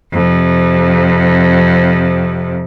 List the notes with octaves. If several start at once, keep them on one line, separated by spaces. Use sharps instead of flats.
F2 C3